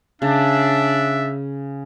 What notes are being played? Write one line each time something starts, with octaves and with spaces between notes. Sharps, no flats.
C#3 D4 E5